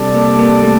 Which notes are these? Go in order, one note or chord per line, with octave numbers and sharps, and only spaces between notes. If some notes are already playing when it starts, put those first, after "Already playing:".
Already playing: C3 G3 D4 A4 D5
A#3
A#3
A3